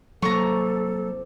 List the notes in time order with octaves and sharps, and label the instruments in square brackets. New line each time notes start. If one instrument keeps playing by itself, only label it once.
[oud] G2 C3 F3 [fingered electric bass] F#3 A#3 [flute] A4 [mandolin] A#5 C#6